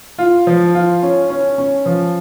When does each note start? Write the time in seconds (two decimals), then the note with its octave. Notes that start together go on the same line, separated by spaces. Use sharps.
0.18 F4
0.47 F3
0.75 F4
1.03 C#4
1.30 C#4
1.58 C#4
1.86 F3